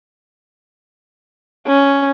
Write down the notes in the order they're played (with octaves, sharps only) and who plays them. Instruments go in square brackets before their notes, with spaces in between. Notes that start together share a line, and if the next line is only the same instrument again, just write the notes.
[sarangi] C#4